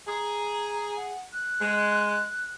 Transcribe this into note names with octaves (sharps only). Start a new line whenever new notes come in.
G#4 A#5
F#5
F#6
G#3